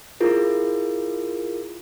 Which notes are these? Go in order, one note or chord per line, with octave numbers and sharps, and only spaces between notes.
E4 F4 G#4 A#4